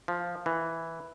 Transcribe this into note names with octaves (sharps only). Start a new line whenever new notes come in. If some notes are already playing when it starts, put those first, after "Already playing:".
F3
E3